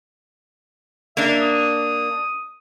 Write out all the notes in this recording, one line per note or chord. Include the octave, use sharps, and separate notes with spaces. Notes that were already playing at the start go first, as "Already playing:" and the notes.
A#3 D4 E5
D#6